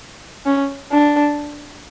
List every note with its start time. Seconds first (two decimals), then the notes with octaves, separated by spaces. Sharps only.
0.46 C#4
0.92 D4